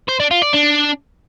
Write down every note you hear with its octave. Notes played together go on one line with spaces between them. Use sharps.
C5
D4
F4
D5
D4